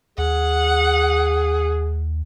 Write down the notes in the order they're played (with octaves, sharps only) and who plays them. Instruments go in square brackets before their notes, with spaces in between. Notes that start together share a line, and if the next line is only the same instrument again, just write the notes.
[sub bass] D#2 [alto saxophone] G#4 [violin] F#5